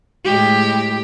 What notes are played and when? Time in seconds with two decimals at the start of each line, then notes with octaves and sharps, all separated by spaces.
0.25 A2 G#3 G4